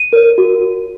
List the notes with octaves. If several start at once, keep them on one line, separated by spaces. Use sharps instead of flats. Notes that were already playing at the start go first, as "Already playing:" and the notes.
Already playing: D#7
A#4 C#5
F#4